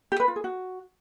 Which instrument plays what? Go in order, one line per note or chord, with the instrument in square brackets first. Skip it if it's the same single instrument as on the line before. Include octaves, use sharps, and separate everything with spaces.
[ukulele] G4
B4
F4
G#4
F#4